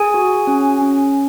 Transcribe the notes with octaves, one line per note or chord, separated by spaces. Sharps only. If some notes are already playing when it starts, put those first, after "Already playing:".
Already playing: G#4 G#5
F#4
C#4
C#4